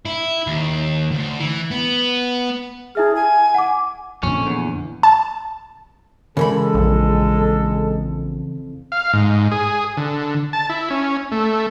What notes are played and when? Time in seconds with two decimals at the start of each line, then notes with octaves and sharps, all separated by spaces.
0.06 E4
0.47 D#2
1.12 D2
1.40 E3
1.71 B3
2.95 E4 G#4 E5 F6
3.15 G#5
3.55 F#5 D6
4.23 F2 A#2 D3 C#4
4.47 E2
5.03 A5
6.37 C#3 E3 G#3 C#4 A4 A#4 B5
6.74 A#1 F2
8.92 F5
9.13 G#2
9.52 G#4
9.97 D3
10.53 A5
10.69 E4
10.90 C#4
11.32 A3